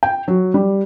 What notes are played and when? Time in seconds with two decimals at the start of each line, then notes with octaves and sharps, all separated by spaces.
0.03 G5
0.28 F#3
0.54 G3